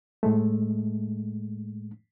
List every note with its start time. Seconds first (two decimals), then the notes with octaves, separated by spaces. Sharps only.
0.23 A2 G#3 A3